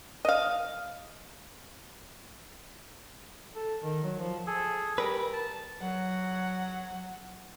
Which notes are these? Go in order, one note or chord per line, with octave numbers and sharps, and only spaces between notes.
D#5 F5
A4
D#3
F#3
F3
G#4 A4
G3 A#4 B4
A5
F#3 F#5